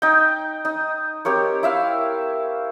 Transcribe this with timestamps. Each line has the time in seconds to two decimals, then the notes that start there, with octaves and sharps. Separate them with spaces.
0.02 D#4 G5
0.65 D#4
1.25 C4 G4 A#4 C#5
1.63 E4 E5 F5